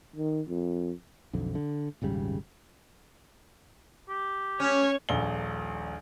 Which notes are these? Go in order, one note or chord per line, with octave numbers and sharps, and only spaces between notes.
D#3
F2
B1 F2 D3
D3
D#1 G#1 C#3 G3
G4
C#4 C#5 C#6
D#1 A#1 G7